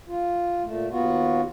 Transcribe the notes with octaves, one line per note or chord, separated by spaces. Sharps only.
F4
A#2 A3
D#2 B3 F4 F#4